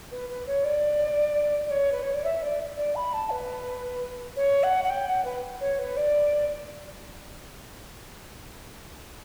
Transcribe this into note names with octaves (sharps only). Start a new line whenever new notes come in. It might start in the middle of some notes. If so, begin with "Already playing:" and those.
B4
B4
C#5
D5
D5
C#5
B4
C#5
D5
E5
D5
D5
B5
A5
B4
C#5
F#5
F#5
G5
F#5
B4
C#5
B4
D5